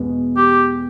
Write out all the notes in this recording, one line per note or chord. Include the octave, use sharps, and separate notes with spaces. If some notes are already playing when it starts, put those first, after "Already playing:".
Already playing: E2 B2 G#3 B3
G4